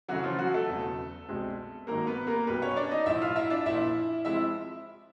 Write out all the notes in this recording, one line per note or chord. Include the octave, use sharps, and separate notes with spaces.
F#2 C#3 E3 F#3 A3 C#4 F#4
F3 F4
F#3 F#4
A3 A4
E1 E2 C#3 F#3
C2 B2 G#3 C4
G#1 G#2 D#3 F#3 A#3 A#4
B3 B4
A#3 A#4
B1 B2 G3 B3 B4
C#4 C#5
D4 D5
D#4 D#5
B1 A2 F3 E4 E5
F4 F5
E4 E5
D4 D5
A#1 A#2 F3 E4 E5
C3 F3 G#3 E4 E5